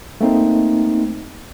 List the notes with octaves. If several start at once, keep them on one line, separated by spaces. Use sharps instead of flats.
A3 A#3 C4 D#4 C5